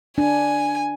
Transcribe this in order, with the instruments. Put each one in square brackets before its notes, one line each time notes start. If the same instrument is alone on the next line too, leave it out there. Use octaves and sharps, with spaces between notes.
[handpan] D4 [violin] G#5